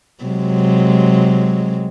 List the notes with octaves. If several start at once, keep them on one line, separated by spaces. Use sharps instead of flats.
C3 F#3 G#3